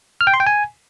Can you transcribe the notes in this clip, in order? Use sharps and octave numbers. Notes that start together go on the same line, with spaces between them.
F6
G5
C6
G5
G#5